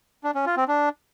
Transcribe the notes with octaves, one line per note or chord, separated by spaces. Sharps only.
D4
C#4
F4
C4
D4